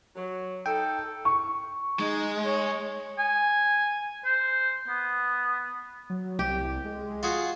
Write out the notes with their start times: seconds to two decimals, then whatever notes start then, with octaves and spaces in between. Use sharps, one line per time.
0.16 F#3
0.66 D#4 A4 G5
1.25 C#6
1.99 G#3 D#4
2.46 C#5
3.19 G#5
4.25 C5
4.88 B3
6.10 F#3
6.39 C2 G4
6.85 G#3
7.23 F4 F#4 G#4